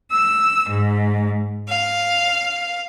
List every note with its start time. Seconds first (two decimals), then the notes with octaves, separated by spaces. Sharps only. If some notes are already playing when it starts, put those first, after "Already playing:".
0.11 E6
0.67 G#2
1.67 F5